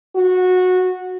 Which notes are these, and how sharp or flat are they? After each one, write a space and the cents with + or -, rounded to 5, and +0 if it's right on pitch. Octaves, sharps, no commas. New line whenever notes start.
F#4 -15